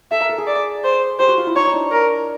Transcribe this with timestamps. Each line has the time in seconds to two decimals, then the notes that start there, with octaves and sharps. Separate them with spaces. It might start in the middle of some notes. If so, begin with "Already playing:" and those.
0.11 A4 E5
0.21 A#4
0.29 A4
0.38 G#4
0.47 D5
0.84 C5
1.19 G4 C5
1.28 F#4
1.38 F4
1.47 E4
1.56 D#4 C#5
1.67 D#4
1.73 D4
1.91 A#4